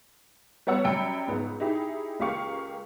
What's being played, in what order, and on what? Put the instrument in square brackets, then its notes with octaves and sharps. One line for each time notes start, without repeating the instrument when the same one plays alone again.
[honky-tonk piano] G3 B3 C#5 F#5 E6
F#2 G3 C#4 G5 B5 C#7
C#2 G#2 B3
D#4 E4 G4 G#4
C#2 A#3 G4 F5 C#6